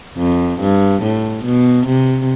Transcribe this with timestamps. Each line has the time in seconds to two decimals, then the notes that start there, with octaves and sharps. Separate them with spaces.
0.17 F2
0.61 G2
1.02 A2
1.45 B2
1.87 C3